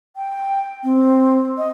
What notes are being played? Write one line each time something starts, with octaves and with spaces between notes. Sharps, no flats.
G5
C4
D#5